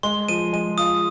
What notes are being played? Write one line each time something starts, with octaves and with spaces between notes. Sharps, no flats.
G#3 C6
F3 D#7
G#3 D#7
F4 D#6